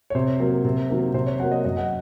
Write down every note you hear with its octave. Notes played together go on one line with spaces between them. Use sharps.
C#5
C3 C5
F#3 A#3
C3
D#3 F#3 A#3
C3 C5
C#5
F#3 A#3 F#5
D#5
F#2 D#5
F#5